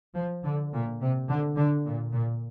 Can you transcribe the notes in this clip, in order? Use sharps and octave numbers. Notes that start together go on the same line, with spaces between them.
F3
D3
A#2
C3
D3
D3
A#2
A#2